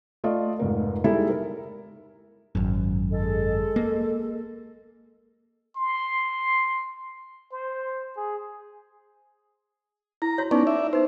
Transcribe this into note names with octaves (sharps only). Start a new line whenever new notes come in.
A3 F4 D5 D#5
F1 G#2 A#4
G3 G#3 D#4 E4 A4
A#4
G#1 F#2
G#3 A4
A#3
C6
C5
G#4
E4 A#5
F#4 C#5
B3 C#4 D#4 D5 C#6
D5 E5
D#4 B4 C5